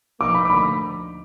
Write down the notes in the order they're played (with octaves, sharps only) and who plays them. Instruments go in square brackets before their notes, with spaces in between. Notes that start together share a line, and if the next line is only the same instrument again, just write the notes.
[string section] A#2 F3 A#3 D#4 [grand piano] D6
[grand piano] B5
D6
[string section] D2 D3 F3 A#3 D#4 [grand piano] B5